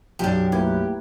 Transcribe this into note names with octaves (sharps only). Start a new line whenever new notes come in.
B1 F#2 D4 G4
A3 A#3 E4 G4 A#4 B4 G#6